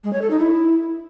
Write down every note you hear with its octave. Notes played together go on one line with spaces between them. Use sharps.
G#3
C#5
A4
D#4
E4